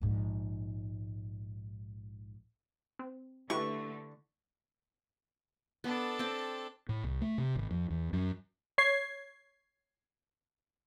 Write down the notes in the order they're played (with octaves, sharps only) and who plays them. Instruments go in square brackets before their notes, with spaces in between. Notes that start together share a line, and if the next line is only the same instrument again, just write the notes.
[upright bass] A#1 G#2
[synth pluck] C4
[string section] D3 A3 [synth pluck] E4 G4 B4 [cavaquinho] C#6
[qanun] B3 [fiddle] D4 A4
[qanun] C4 G5 A5
[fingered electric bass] A2
C2
A3
C3
G#1
F2
E2
F#2
[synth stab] C#5 G#6 C7